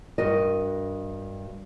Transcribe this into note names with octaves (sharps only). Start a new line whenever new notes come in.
G2 F#4 A#4 D#5